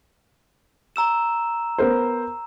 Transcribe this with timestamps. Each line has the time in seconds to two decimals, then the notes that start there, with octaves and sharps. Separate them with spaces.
0.96 A#5 E6 E7
1.78 B3 A#4 C5